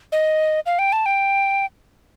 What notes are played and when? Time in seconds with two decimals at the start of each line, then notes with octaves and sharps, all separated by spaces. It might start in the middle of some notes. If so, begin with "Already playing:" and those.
0.12 D#5
0.66 F5
0.79 G5
0.92 A5
1.06 G5